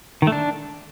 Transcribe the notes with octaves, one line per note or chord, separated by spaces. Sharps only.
D#3
A3
D4